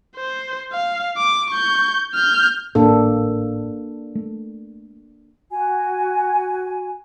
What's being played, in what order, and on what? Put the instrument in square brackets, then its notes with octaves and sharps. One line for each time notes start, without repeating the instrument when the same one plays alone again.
[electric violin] C5
F5
D6
C#6 G6
F6 G6
[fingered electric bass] G#1 A2 [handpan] A#3 D4 A4
[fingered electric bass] A3
[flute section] F#4 G#5